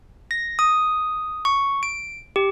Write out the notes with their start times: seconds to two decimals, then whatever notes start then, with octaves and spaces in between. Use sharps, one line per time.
0.31 A#6
0.59 D#6
1.45 C#6
1.83 D7
2.36 G4